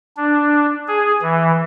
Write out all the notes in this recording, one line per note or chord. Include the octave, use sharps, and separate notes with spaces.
D4
G#4
E3